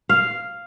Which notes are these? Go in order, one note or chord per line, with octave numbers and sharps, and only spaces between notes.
F5